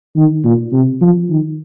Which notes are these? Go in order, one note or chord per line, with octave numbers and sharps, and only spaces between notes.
D#3
A#2
C3
F3
D#3